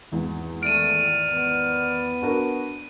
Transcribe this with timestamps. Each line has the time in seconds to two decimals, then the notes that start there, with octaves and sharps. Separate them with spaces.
0.12 G#1 E2
0.63 D#3 A3 D5 F6 D7 D#7
1.32 B3
2.22 D4 F#4 A#4